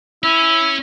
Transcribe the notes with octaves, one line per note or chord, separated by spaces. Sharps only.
C#4 E4